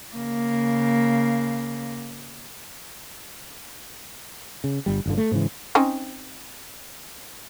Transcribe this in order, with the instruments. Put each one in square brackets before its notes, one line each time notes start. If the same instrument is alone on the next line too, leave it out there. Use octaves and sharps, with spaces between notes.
[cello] C#3 A#3
[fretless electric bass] C#3
G1 G3
G1 G2 D3
A3
G#2 C#3 E3
[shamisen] C4 C#4 D#4